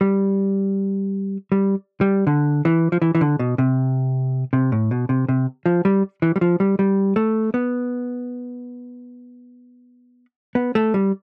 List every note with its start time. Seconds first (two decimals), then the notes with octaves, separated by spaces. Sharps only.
0.01 G3
1.52 G3
2.01 G3
2.27 D3
2.65 E3
2.92 F3
3.02 E3
3.15 E3
3.21 D3
3.39 B2
3.58 C3
4.53 C3
4.72 A2
4.91 B2
5.09 C3
5.29 C3
5.66 F3
5.85 G3
6.22 E3
6.36 G3
6.41 F3
6.60 G3
6.79 G3
7.16 A3
7.54 B3
10.55 B3
10.75 A3
10.94 G3